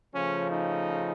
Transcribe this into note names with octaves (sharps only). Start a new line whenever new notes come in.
C#3 F3 A3 C#4
D#4